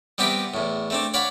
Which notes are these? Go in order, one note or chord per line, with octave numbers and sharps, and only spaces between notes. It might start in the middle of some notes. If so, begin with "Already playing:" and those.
G3 B3 C4 G4 A#4 E5
E2 A2
A3 C4 D4
C#5 D5 F5 F#5 B5